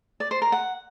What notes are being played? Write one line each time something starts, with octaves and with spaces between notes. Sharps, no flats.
D5
C5
A#4
F#5